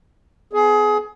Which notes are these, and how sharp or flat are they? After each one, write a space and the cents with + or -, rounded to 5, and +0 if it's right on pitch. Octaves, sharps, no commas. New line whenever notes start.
B3 +35 G#4 +25